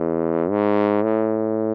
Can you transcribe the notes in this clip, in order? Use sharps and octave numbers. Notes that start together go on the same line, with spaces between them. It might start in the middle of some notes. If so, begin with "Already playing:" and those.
Already playing: E2
G#2
A2